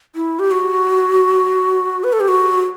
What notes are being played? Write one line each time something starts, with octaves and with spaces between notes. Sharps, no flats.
E4
G4
F#4
B4
A4
G4
F#4